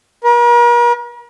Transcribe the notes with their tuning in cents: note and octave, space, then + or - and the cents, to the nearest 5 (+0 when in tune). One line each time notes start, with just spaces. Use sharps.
A#4 +45